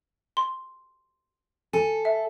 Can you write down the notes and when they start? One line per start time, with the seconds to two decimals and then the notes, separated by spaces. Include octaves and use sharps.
0.37 C6
1.73 A4 G#5
2.05 E5